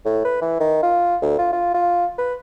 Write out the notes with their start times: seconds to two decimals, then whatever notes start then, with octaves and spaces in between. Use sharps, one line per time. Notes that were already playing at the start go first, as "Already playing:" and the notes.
0.05 A2
0.25 B4
0.41 E3
0.60 D#3
0.83 F4
1.22 D2
1.38 F4
1.53 F4
1.74 F4
2.18 B4